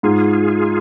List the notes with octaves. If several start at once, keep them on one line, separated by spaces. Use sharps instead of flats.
G#2 F4 G#4